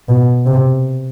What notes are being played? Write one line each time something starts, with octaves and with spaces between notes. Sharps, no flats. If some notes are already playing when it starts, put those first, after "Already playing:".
B2
C3